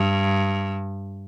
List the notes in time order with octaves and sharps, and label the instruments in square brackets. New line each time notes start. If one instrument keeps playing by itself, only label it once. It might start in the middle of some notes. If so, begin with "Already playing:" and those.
Already playing: [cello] G2